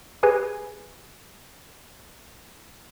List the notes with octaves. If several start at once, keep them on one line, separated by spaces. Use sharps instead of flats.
G4 G#4 B4 G#5 G#6